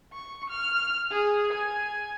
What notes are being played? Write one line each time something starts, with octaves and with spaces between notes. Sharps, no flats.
C#6
F6
G#4
G#5